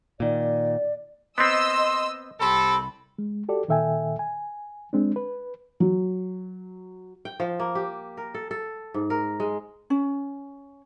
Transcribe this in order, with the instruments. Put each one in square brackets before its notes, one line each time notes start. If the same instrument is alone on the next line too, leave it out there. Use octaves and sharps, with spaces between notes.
[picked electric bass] A#2 D#3 [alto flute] D5
[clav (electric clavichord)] B3 C4 [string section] D#5 E6 [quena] C6
[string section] C2 [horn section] C4 G4 A4 [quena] B5
[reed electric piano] G#3
F#4 G4 A4 D5
A#2 D#3 A4 E5 G5 G#5
G#5
G#3 C4 D4
B4
[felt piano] F#3
[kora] G5
F3
A#3
G4
A#4
A4
A4
G#2
A#4
G#3
[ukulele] C#4